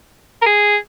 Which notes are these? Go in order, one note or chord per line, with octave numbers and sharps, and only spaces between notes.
A#4
G#4